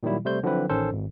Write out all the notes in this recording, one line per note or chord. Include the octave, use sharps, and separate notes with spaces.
A#2 D#3 F#3 G3 E4
C3 G3 A3 C5 G6
D3 F3 F#3 C4 E4 B4
A1 D#3 C#4 A4 C5
G#1